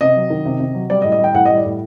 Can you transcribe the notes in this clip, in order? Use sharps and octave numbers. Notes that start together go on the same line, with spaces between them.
C3 D#5
F#3
D#3
C3
C3
F#3
G3 D5
D#5
A2
D#5
G3 G5
A2 F#5
G3 D#5
D5
A2